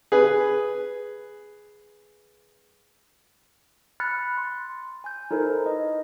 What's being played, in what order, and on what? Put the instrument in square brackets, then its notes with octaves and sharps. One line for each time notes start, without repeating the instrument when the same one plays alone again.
[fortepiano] G#4 B4
[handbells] B5 F6 F#6 A6 C#7
C6
G#5 G6
D#4 E4 A4 A#4 C5
B4 D#5